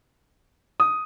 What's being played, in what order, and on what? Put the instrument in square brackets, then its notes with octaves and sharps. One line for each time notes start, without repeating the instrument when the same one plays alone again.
[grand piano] D#6